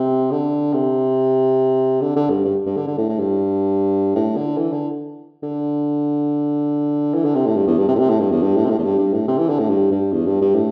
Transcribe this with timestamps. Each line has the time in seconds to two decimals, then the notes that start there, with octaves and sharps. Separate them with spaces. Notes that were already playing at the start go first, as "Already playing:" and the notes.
Already playing: C3
0.31 D3
0.73 C3
2.02 D3
2.16 D3
2.30 G2
2.45 G2
2.66 G2
2.77 D3
2.87 D3
2.98 A2
3.09 A2
3.20 G2
4.16 A2
4.37 D3
4.58 E3
4.73 D3
5.43 D3
7.14 E3
7.25 D3
7.35 C3
7.46 A2
7.56 G2
7.67 E2
7.78 G2
7.88 C3
7.95 A2
7.99 C3
8.10 A2
8.20 G2
8.31 E2
8.42 G2
8.57 A2
8.66 C3
8.70 A2
8.78 E2
8.84 G2
8.98 G2
9.13 A2
9.28 C3
9.38 E3
9.49 D3
9.59 A2
9.70 G2
9.91 G2
10.13 E2
10.27 G2
10.41 G2
10.55 A2